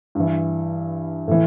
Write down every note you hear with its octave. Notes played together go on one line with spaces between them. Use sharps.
G2 E3
A2 E3